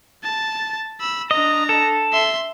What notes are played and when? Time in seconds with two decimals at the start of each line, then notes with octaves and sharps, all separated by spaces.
0.24 A5
1.00 B5 E6
1.31 D4 D#5 A#5
1.69 A4
2.13 E5 C6